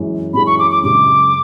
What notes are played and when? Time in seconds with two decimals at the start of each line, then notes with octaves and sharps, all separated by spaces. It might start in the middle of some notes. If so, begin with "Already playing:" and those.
Already playing: F#2 E3 G#3 C#4
0.34 F#2 E3 G#3 C#4 B5
0.46 C#6
0.59 D6
0.71 D6
0.84 F#2 C#3 G#3 D6